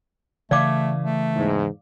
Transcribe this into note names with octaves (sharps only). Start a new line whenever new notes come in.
C#3 E3 A3 D5 F5 D6
A3
E2 G#2